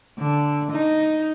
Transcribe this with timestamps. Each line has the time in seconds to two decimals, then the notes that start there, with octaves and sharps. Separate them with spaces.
0.19 D3
0.72 D#4